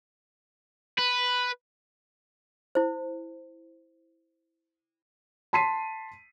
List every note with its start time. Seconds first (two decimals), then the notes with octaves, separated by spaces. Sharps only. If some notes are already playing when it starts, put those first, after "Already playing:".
0.99 B4
2.75 E4 C5
5.53 A5 C6 B6 C7 D#7